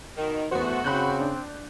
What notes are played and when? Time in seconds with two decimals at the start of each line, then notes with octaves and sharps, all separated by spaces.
0.16 B2 D#3
0.51 E2 A3 B3 F#4 C5
0.84 C#3 C4 B5 F#6 G6
1.20 D4